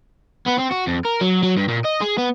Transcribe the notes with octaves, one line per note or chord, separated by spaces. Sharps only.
B3
C4
F#4
F2
A#4
F#3
F#3
G2
A#2
D#5
G#4
B3